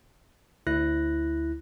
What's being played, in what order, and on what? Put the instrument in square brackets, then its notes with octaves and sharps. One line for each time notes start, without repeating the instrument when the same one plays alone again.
[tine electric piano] D2 E4 F#6 A#6